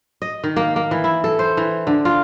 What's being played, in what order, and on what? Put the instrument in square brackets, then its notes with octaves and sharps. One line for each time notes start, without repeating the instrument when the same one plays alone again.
[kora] D#5
D#3
A#3
A#3
E3
E4
A4
C5
E3
D3
F4